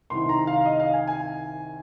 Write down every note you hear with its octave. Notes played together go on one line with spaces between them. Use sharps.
C2 C3 D#3 C6
A#5
F5
D#5
F5
G#5
G#5